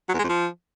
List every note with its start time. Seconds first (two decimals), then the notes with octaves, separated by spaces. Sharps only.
0.09 F#3
0.14 E2
0.19 G#3
0.24 F2
0.29 F3